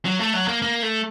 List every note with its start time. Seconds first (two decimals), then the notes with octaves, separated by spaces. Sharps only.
0.05 F#3
0.19 A3
0.34 F#3
0.48 A#3
0.62 A#3
0.82 A3